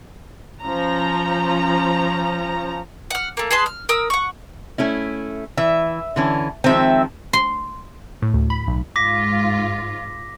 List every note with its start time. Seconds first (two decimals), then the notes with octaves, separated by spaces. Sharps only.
0.62 F3 C#4 A#5
3.10 F#5 F6
3.37 A3 A#3
3.51 G#4 B4 A5 C6
3.66 F6
3.89 A#4 D#6 E6
4.10 F#5 C#6
4.78 A3 C#4 E4
5.58 E3 E5
6.16 D3 E3 C#4
6.64 D#3 F3 G#3 C4 E5
7.33 C6
8.22 A2
8.34 D2
8.50 B5
8.67 B1
8.96 G#2 F4 D6 A#6 B6